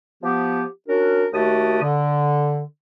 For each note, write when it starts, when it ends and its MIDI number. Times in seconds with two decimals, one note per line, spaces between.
0.23 0.63 53
0.23 0.63 59
0.23 0.63 67
0.88 1.26 61
0.88 1.26 62
0.88 1.26 66
0.88 1.26 70
1.33 1.78 39
1.33 1.78 57
1.33 1.78 66
1.33 1.78 67
1.33 1.78 81
1.33 1.78 87
1.82 2.61 50